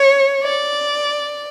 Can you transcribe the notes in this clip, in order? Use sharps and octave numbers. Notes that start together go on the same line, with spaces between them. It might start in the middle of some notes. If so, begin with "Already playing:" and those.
Already playing: C#5
D5